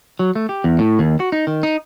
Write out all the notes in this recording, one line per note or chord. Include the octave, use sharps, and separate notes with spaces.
F#3
A3
G4
E2
A2
D#2
F#4
D#4
D#3
D#4